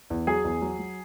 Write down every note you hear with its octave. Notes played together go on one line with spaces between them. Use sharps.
E2
F#3 G#4 G#5
E2
F#3
F#3